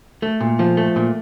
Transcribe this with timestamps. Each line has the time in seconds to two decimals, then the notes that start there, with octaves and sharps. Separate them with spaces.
0.22 A3
0.41 A#2
0.59 F3
0.77 A3
0.96 A#2